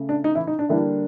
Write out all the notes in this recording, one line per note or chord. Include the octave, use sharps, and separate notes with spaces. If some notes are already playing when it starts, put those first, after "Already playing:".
Already playing: C#3 A3
D4
D#4
E3 E4
D#4
D4
D3 E3 G3 A#3 D4 E4